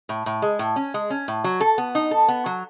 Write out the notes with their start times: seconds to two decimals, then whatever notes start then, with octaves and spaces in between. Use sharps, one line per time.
0.09 A2
0.26 A2
0.42 G#3
0.59 A2
0.76 C#4
0.94 G#3
1.10 C#4
1.28 A2
1.44 F#3
1.60 A4
1.78 B3
1.95 D#4
2.11 A4
2.28 B3
2.46 F#3